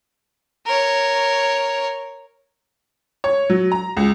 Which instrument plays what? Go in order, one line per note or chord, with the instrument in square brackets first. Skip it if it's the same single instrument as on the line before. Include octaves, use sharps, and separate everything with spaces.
[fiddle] A#4 C#5
[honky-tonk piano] C#5
F#3
A#5
C#2